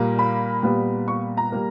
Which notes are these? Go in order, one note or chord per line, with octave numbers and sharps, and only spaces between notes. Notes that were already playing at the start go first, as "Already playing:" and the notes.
Already playing: A#2 G3 A#3
B5
A#2 G3 B3
C#6
A#5
G3 A#3